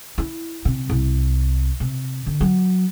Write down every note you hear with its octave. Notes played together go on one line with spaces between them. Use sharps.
E4
C3
C2
C3
D3
F#3